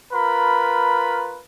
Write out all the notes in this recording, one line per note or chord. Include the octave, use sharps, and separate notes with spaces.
F4 A#4 B4 B5